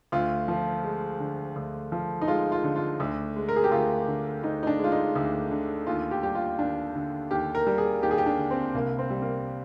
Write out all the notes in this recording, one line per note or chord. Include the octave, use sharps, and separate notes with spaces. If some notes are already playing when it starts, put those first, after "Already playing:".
D2 F4
F3
G#3
D3
D2
F3
D#4
G#3 F4
F4
D3
F4
D2
G#3
A#4
G#4
G4
D2 F4
D3
D2 D#4
D#4
D4
G#3 F4
D#4
D2
D3
D#2 F4
G4
G3 G4
F4
D#2 D4
D3
D#2 G4
A#4
G3
G#4
D#2 G4
G#4
G4
D4
D3
C4
C2 A#3
C4
G3
A#3